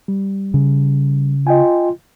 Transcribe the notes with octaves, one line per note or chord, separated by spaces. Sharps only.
G3
C#3
F4 D#5 G5 G#5